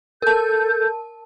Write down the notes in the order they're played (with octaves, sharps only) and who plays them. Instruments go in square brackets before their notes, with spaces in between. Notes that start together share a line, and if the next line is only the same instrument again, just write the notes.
[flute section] A4 G6 [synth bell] A#4 A5